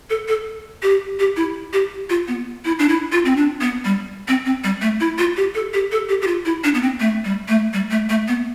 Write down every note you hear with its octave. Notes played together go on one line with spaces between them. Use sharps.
A4
A4
G4
G4
E4
G4
F4
B3
E4
D4
E4
F4
C4
D4
B3
G3
C4
C4
G3
A3
E4
F4
G4
A4
G4
A4
G4
G4
F4
E4
D4
B3
C4
A3
G3
A3
G3
A3
A3
B3